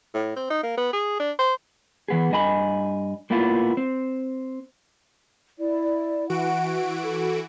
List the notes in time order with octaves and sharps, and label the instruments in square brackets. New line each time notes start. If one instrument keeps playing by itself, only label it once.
[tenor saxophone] A2
C4
D#4
A#3
B3
G#4
D4
C5
[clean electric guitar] E3 B3 G#4
G2 D#5 G#5 B5
A2 A#3 B3 E4 F4
C4
[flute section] E4 D5
[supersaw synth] E3 F#4 D7 [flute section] F#5
[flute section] A4